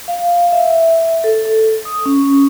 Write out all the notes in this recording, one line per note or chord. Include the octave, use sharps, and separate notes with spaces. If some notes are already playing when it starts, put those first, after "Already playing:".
F5
E5
A4
A4
D#6
C#4